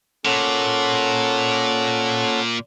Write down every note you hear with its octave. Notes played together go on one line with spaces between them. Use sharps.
A#2 C#4 A4 F#5